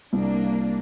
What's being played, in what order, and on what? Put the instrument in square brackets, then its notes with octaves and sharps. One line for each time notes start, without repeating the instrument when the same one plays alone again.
[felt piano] C2 [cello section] A#3 D4